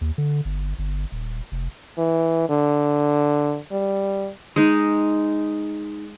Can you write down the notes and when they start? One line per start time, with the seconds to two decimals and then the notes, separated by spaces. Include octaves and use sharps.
0.01 D#2
0.18 D3
0.45 G1
0.79 G1
1.12 D#1
1.52 F1
1.98 E3
2.49 D3
3.72 G3
4.56 G#3 D#4